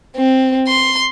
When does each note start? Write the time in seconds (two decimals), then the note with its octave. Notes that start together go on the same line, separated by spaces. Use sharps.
0.16 C4
0.68 C6